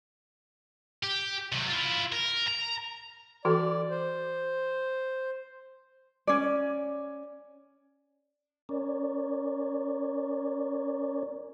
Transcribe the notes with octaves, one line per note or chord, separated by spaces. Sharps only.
G4
C3 F#3
E4 F4
A#4
A#5
E3 F#4 A4 D5
C5
C#4 D5
C#4 A#4 C#5 D5